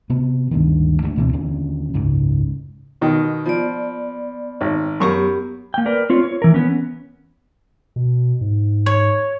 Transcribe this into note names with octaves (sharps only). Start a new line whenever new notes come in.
C3 B3
D1 D2 G2 D#3
D3 F3 A3
C#2 B2 E3 C4
D#2 D3 C#4
F#1 C#2 G#2 C#3
B2 D#3
F3 B3 D5
G#1
F#2 B3 G4 A#4 C#6
A#3 G5
A#4 B4 D5
C4 F4 C#5
C#5
E3 A#4
B3 C#4
B2
G#2
C#5